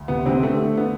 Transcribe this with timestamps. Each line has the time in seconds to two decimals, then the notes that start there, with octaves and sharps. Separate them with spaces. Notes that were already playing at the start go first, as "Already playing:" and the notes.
Already playing: D2
0.08 C3 B3
0.26 C3 C4
0.43 D3 A3
0.77 D3 B3